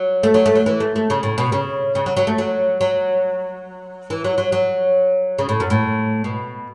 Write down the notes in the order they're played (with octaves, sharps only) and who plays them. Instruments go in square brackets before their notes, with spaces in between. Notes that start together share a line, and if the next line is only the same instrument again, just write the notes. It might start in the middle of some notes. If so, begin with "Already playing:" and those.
Already playing: [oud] F#3
A3
F#3
A3
F#3
E3
A3
A3
C#3
A2
B2
C#3
C#3
F#3
F#3
A3
F#3
F#3
E3
F#3
F#3
F#3
C#3
A2
F#2
A2
B2